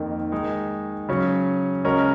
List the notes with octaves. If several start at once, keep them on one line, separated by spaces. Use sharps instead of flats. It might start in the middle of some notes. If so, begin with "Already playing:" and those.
Already playing: F2 D#3 A#3
D#3 G#3 D#4
C#3 F#3 C#4
C#3 G#3 C#4 F#4 A#4